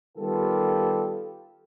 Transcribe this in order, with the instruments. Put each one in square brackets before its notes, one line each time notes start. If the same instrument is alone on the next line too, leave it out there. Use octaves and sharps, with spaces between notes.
[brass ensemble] D#3 G3 B3 F4 G4 A4